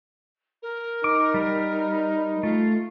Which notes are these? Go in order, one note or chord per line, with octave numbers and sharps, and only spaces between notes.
A#4
D#4 D6
G3
A3 F4